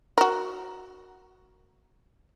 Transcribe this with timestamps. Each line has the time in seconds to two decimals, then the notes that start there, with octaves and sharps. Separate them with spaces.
0.18 F#4 A#4